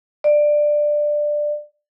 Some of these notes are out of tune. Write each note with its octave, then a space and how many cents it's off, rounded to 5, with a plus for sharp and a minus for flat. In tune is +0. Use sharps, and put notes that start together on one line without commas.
D5 +15